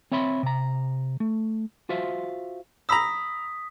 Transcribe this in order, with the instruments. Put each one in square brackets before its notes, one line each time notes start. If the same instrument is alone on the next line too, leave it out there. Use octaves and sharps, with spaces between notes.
[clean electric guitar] C4 C#5 E5 B5 C6
C3 A#5
A3
F4 F#4 C5 E5 F5
[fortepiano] A#5 B5 E6 [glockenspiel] D#6 B6